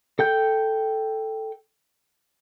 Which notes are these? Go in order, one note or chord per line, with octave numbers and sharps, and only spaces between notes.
A4 G5 G6